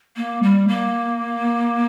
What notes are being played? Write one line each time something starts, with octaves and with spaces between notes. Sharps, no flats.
A#3
G3
A#3